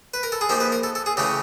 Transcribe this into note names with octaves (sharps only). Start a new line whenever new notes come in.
B4
A#4
A4
G#4
F3 A#3 D#4 G4
B4
A#4
A4
A4
G#4
C#3 E3 A3 C#4 G4